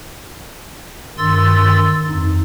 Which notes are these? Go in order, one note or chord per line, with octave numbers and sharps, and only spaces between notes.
G2 D#3 C6 E6 A6
F2 D#4